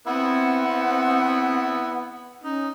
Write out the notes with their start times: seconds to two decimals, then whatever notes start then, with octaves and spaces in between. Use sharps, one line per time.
0.07 B3 C4 E4 F#5
2.44 C#4 D#4